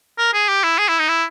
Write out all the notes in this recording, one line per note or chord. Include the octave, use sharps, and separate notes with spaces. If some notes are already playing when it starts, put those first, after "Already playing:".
A#4
G#4
G4
E4
G#4
E4
D#4
E4